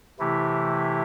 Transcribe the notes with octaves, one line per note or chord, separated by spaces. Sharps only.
C3 E3 A3 E4 G4